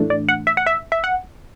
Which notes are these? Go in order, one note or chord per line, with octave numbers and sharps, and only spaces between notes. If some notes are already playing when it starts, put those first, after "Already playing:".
Already playing: A2 E3 A3 D4
D5
F#5
E5
F#5
E5
E5
F#5